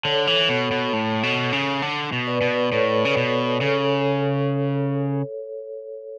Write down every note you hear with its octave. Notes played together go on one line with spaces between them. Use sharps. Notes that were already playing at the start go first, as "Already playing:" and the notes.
D3 A4 C#5
E3
B2
B2
A2
B2
C#3
D3
B2
B4 D5
B2
A2 A4 C#5
C#3
B2
C#3 A4 C#5